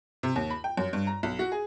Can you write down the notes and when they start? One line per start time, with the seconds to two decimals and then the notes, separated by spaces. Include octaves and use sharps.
0.23 C3
0.36 D#2
0.50 B5
0.64 G5
0.77 F#2
0.93 G2
1.07 A#5
1.23 B1
1.39 F#4
1.52 G#4